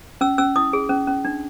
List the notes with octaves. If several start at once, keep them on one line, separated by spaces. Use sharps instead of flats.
C#4 E6
C#4 E6
E4 D#6
G#4
C#4
C#4
D4